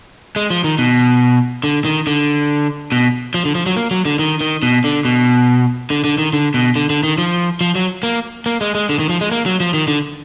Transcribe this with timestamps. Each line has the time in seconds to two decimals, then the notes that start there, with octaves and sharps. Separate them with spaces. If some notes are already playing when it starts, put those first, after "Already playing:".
0.36 G#3
0.50 F3
0.64 D#3
0.78 B2
1.64 D3
1.85 D#3
2.07 D3
2.92 B2
3.34 F3
3.45 D3
3.55 F3
3.66 F#3
3.77 A#3
3.91 F#3
4.05 D3
4.19 D#3
4.41 D#3
4.63 B2
4.84 D3
5.05 B2
5.90 D3
6.04 D3
6.18 D#3
6.33 D3
6.54 B2
6.76 D3
6.90 D3
7.03 D#3
7.18 F3
7.61 F3
7.75 F#3
8.03 A#3
8.46 A#3
8.61 G#3
8.75 G#3
8.89 D3
8.99 D#3
9.09 F3
9.21 G#3
9.31 A#3
9.46 F#3
9.60 F3
9.74 D#3
9.88 D3